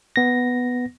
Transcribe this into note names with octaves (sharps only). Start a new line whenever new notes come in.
B3 A#6